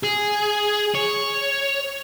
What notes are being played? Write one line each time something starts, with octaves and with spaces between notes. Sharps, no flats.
G#4
C#5